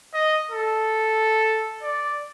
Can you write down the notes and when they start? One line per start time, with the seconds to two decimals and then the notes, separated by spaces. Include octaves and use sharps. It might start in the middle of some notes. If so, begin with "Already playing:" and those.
0.14 D#5
0.51 A4
1.83 D5